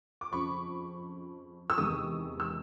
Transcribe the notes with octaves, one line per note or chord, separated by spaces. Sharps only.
D6
F2 C#3 F3 B5 C#6
E6
E2 C3 D#3 G#3 C#6 D#6
E6